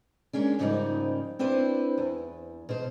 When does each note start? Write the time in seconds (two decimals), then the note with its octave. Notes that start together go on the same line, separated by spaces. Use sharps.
0.33 G#3 A#3 C#4 D4
0.59 G#2 C#3 F3 G3 A#3 D#4
1.39 C4 D4 E4 B4 C5
1.98 E2
2.69 B2 C5